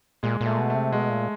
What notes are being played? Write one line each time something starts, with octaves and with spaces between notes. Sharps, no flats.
A#2 G#3
A#2
A3
B2
C3 A3
B2 G#3
A#2